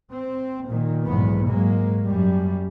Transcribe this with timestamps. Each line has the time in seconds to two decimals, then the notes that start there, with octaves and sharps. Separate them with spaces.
0.11 C4
0.67 A#2 D#3
1.05 B1 E2 G#2 B3
1.48 G#2 F#3 G#3 A#3
2.08 F#2 G3